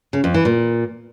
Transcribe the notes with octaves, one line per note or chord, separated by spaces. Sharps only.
C#3
F2
E3
A#2